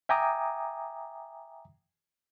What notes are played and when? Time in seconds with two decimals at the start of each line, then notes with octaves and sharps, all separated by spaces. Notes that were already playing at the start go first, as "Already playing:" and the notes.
0.09 E5 G5 G#5 A#5 D6 D#6